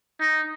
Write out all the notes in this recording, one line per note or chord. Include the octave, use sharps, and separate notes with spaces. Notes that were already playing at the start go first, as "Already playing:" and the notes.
D#4